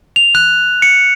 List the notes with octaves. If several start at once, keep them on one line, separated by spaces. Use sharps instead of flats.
F7
F#6
C#7